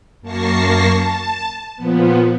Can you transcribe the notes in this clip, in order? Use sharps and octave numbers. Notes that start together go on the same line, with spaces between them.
F#2 A#3 A5 C#6 A#6 C7
A5
A#2 F3 B3